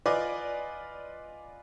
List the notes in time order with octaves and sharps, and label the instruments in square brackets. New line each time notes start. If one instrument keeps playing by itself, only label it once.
[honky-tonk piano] F4 B4 D5 D#5 G#5 D6